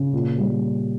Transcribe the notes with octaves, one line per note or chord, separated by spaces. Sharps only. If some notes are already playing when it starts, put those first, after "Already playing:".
Already playing: C#3
A#2
G3